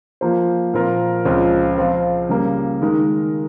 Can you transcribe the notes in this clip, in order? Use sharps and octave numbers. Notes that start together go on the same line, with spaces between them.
F3 A#3 F4 C5
A#2 F3 C4 F4 A#4
C#2 C#3 F3 C4
F3 C4 F4
C#3 G3 A#3
D#3 G#3 D#4 A#4